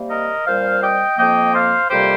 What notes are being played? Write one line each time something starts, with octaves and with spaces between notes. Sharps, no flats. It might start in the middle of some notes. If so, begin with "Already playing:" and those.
Already playing: C3 G3 A#3
A#4 D#5
A#2 G3 C4 C5 F5
D#5 G5
F2 F3 A#3 D#5 G5
C5 F5
F2 C3 G3 A#3 G4 C5